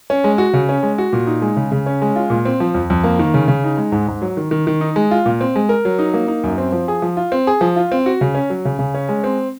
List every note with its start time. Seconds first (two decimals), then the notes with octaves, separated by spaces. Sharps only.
0.10 C#4
0.24 G#3
0.38 F#4
0.53 C#3
0.69 C#4
0.83 G#3
0.98 F#4
1.13 A#2
1.27 D#4
1.42 G#3
1.57 C#3
1.72 C#3
1.86 C#4
2.02 G#3
2.16 F4
2.30 A#2
2.45 C4
2.60 F3
2.75 F2
2.90 F2
3.04 A#3
3.19 D#3
3.34 C#3
3.48 C#3
3.64 D#4
3.77 G#3
3.92 G#2
4.08 G#2
4.22 F#3
4.37 D#3
4.51 D#3
4.67 D#3
4.81 D#4
4.96 G#3
5.11 F4
5.26 A#2
5.41 C4
5.56 G#3
5.69 A#4
5.85 F#3
5.99 D#4
6.14 A#3
6.28 D#4
6.44 F#2
6.58 C4
6.72 F3
6.88 G#4
7.02 F3
7.17 F4
7.32 C4
7.47 G#4
7.61 F3
7.76 F4
7.92 C4
8.06 F#4
8.21 C#3
8.35 C#4
8.50 F#3
8.65 C#3
8.79 C#3
8.94 C#4
9.09 G#3
9.24 C4